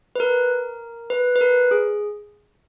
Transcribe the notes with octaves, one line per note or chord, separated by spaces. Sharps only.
B4
A#4
B4
B4
A#4
G#4